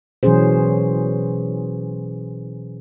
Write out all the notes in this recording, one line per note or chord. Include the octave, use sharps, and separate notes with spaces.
B2 E3 F#3 C#4 G#4 C5